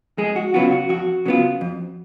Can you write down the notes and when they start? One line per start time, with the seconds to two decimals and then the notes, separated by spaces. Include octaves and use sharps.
0.17 F2 G#3 G#4
0.36 F#4
0.54 C#3 F#3 B3 F4 F#4
0.72 F#4
0.89 F2 F#4
1.26 C#3 F#3 B3 F4
1.61 F2